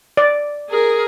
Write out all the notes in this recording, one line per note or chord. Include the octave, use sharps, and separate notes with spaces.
D5
G#4 A#4